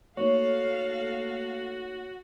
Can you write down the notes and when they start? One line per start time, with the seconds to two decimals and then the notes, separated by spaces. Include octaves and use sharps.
0.17 A3 A#3 D#4 F#4 A4 C#5 F5